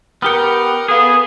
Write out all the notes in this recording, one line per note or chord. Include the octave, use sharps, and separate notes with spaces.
B3 G4 A#4 G5 F6 C#7
B3 G#4 A4 F5